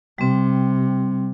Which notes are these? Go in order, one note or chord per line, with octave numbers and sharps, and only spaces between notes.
C3 G3 C4